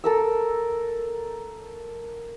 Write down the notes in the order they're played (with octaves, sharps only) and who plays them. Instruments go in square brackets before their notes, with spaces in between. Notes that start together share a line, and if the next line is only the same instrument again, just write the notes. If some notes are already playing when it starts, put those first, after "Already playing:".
[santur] A4 A#4 E6